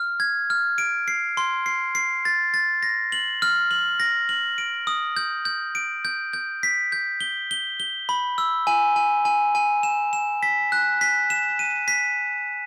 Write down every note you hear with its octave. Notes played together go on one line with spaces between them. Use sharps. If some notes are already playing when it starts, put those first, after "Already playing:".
Already playing: F6
G#6
F6
D7
C7
C6
C7
C7
A6
A6
A#6
F#7
F6
F#7
A#6
F#7
D7
D#6
G6
G6
D7
G6
G6
B6
G6
G7
G7
G7
B5
E6
G#5
G#5
G#5
G#5
E7
E7
B6
F#6
B6
E7
D#7
B6